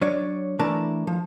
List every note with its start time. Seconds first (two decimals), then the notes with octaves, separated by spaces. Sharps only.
0.01 F#3 D4 C#5 D5
0.59 E3 A3 D4 E4 A#4 A5
1.07 F3